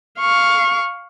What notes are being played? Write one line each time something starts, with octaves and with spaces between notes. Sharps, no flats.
F5 C#6